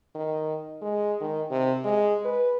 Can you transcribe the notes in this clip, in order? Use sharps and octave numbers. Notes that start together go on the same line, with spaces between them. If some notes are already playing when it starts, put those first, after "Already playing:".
D#3
G#3
D#3
C3
G#3
B4